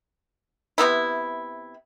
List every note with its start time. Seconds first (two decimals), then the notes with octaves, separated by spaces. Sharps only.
0.78 C3 D#3 B3 E4